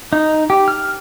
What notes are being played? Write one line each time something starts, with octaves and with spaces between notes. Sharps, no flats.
D#4
G4
F6